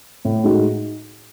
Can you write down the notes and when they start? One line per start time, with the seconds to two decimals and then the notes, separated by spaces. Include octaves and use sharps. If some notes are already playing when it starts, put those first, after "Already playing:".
0.25 A2
0.44 G#3 D#4 F#4